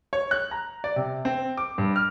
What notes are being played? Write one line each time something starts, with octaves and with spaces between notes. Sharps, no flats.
C#5
F#6
A#5
D5
C3
C4
D6
G2
F6